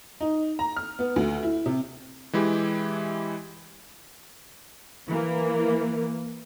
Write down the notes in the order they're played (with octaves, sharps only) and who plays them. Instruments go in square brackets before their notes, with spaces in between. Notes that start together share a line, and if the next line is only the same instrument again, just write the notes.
[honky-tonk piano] D#4
A#5
F6
B3
D2
E4
C3
[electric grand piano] E3 G#3 E4 G4
[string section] E3 A#3